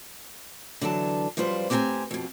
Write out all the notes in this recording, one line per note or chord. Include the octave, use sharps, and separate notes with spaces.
D3 E3 F#3 A5
F#2 F3 G3 F4 B4 C5
A2 C4 G4 G5 G#5 A#5
F2 B2